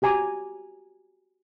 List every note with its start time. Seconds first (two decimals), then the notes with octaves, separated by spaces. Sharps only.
0.02 F#4 G4 G#5 A#5 D6